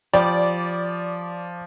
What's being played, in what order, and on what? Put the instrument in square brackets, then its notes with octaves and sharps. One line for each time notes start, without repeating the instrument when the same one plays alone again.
[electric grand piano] F3 [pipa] G3 [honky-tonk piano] D5